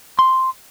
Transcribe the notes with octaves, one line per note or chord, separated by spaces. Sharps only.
C6